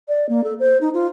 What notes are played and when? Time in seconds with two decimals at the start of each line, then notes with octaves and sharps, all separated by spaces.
0.08 D5
0.29 A#3
0.44 A4
0.59 C5
0.81 D#4
0.94 F4